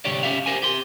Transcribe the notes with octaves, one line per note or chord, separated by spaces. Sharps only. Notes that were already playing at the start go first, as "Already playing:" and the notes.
C2 G#2 D3 G4 C#5 D5
C#4 G4 E5 F5
G4 A#4 C5 G#5
G4 C6